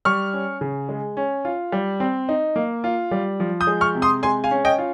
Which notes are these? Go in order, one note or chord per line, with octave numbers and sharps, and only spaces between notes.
G3 C#6 F6
C#4
C#3
G#3
C#4
F4
G3
C4
D#4
A#3
F4
G3
F3
D#6 G6
G#3
C#6 F6
C3
C6 D#6
G#3 G#5 C6
F5 G#5
C#4
D#5 G5
F4